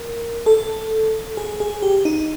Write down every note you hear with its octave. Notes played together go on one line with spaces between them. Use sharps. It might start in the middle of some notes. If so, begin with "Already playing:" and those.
Already playing: A#4
A4
G#4
G#4
G4
D#4